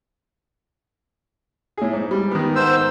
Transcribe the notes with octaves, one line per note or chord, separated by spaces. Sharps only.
A2 G#4
G#2
G3
D#3 B3
G#2 C5 E6